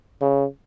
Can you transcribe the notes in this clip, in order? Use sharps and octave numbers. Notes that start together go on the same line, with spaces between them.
C#3